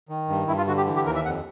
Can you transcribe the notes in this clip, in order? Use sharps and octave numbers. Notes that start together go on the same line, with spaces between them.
D#3
G2
G2 E4
F4
D3 F#4
G4
E3
G4
D#2 A#4
E5
F2 F#5